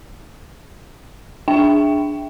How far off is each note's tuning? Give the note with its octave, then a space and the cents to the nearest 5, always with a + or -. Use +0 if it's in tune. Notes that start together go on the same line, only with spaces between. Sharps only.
D4 +0 E5 +5 G5 +0